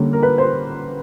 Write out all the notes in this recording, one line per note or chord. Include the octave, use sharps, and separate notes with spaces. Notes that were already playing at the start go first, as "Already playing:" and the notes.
Already playing: D3 G3 A#3 C#4
A#4
B4
C5